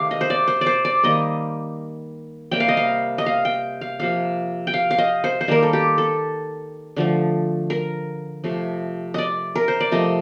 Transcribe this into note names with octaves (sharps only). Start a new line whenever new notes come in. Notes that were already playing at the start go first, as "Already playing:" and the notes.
Already playing: C3 D#3 A3 G4 F5
D#5
C5
D5
C5
D5
C5
D5
D#3 G3 A#3 D#5
C3 G3 A#3 G5
F5
D#5
F5
D#5
F5
G5
F5
C3 F3 A#3 F5
G5
F5
F5
D#5
C5
C5
D#3 G3 A#3 A#4
A4
G4
A4
D3 F3 A3
A#4
C3 F3 A3
D5 D#5
A#4
C5
D5
C3 F3 A3 D#5